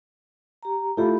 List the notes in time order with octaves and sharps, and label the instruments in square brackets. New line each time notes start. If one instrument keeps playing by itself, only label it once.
[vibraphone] G4 A#5
[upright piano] A3 F4 [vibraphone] E4 G4 B5